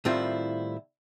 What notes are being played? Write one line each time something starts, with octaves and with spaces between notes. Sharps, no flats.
A2 D#3 G3 C4 E4 F4